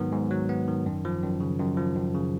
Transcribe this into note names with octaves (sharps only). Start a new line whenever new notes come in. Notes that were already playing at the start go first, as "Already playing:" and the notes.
Already playing: G#2 D#3 F#3 B3
G#2
F#3
B3
D#3
F#2
F3
F#2
C#3
F#2
F3
F#2
C#3